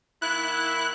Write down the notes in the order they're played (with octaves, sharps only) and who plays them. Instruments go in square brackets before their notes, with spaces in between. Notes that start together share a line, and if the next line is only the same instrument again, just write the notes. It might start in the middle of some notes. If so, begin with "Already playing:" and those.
[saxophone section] D#3 A#3 E4 [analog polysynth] F#6